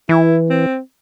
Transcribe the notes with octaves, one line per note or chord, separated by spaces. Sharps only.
E3 E4
C4